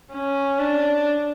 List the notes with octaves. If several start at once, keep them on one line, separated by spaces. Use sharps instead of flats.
C#4
D4